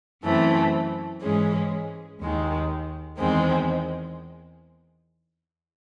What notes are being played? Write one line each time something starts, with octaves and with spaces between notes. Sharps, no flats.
F#2 E3 A3 C4
G#2 E3 G#3 C#4 G#4
D#2 D#3 G#3
E2 D#3 G#3 C4